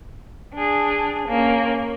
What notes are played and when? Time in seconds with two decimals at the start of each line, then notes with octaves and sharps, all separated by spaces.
0.55 D4 G#4
1.28 A#3 C#4